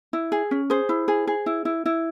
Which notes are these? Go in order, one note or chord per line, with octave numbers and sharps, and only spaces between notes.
E4
G#4
C#4
G#4 C5
E4
G#4
G#4
E4
E4
E4